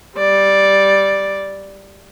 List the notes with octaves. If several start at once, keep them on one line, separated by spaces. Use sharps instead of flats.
G3 D5